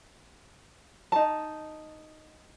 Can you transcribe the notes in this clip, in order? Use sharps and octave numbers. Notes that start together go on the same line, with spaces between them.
D#4 A5